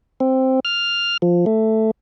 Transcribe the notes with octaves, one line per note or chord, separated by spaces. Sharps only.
C4
F6
F3
A3